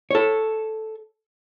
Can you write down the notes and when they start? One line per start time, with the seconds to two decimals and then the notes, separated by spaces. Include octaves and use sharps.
0.11 A4 C#5